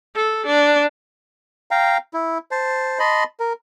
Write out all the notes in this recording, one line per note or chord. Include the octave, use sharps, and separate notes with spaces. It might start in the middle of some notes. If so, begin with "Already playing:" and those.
A4
D4
F5 G5 A#5
E4
C5 A5
D#5 A5 B5 C6
A#4